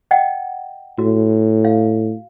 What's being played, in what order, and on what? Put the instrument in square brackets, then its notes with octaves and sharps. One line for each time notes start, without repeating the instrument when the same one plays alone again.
[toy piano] D#5 F#5 G5
[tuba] A2 [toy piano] F#4
[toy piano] F5